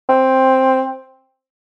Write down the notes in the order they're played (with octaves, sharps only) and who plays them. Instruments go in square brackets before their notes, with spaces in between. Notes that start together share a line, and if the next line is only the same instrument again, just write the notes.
[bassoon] C4